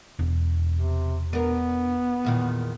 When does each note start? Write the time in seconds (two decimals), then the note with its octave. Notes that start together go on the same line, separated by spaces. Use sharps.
0.19 E1
0.74 C3
1.33 B3 D4 A#4
2.25 E2 A#2 D#3